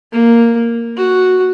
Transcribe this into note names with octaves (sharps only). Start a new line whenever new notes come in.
A#3
F#4